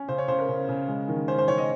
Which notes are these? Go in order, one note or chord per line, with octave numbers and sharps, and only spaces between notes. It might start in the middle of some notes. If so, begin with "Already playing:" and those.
Already playing: C#4
C#3 C5
C#5
C#3 C5
A#4
C#3
C#3
G#3
D#3
C#4 C5
C5
D#3 C#5
D#5